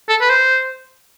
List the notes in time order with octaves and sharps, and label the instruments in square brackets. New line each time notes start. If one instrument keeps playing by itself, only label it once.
[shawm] A4
B4
C5